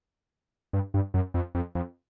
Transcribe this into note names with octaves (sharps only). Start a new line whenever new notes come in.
G2
G2
F#2
F2
F2
F2